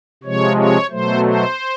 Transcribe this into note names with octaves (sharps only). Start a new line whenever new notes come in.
C3 F3 G#3 C#5
C#5
B2 F#3 A3 C5
C5